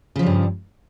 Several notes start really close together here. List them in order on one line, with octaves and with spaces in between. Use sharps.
C#3 F3 G3 G2